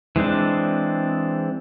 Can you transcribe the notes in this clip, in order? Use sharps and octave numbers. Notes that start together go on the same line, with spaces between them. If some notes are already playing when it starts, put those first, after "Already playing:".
E3 G#3 C4 D4